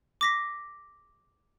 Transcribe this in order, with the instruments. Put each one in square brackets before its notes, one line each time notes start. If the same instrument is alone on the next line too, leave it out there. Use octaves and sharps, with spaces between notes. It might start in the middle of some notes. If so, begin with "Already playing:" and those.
[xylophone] D6 A#6 B6